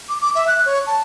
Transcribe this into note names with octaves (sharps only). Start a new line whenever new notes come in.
D6
D6
E5
F#6
C#5
A5